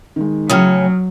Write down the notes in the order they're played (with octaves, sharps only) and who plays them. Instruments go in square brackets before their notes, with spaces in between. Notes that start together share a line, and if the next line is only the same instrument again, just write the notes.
[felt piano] D#3 G#3
[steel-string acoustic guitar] A2 C#3 C#4 [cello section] F#3 [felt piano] D#6 F6